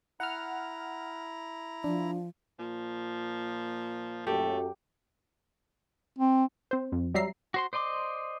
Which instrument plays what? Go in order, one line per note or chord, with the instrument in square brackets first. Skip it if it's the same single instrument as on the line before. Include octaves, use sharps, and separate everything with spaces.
[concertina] E4 A#5 [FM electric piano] F#5 F6
[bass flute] F3 [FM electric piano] D4
[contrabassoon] A#2 [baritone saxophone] F3
[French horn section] F#2 F#3 A4 [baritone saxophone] A3 [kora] G4
[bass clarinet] C4
[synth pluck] C4 C5
F2
F#3 G3 E5 A#5 C7
[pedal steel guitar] F#4 C5 C6
C5 D5 D#5 C6 D6